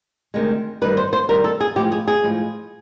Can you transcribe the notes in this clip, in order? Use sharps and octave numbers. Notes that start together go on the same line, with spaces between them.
D2 C3 D#3 G#3
G2 D#3 G3 B4
C5
C5
G2 D#3 G3 A#4
A4
G#4
A2 F3 G#3 G4
G#4
G#4
A2 F3 G#3